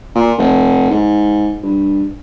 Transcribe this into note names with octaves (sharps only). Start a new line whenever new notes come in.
A#2
F1
G#2
G2